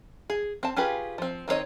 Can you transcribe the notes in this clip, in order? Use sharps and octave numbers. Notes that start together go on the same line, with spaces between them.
G#4
C4 A5
C#4 F4 G4 G#4 B4
F3 C4
D#3 C4 E4 C#5 D#5